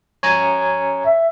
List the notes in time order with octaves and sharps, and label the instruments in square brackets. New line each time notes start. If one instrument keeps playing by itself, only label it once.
[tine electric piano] C#5 G#5 A#5
[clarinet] E5